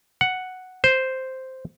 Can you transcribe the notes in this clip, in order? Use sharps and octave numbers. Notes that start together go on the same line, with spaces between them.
F#5
C5